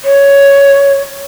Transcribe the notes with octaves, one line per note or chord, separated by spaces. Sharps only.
C#5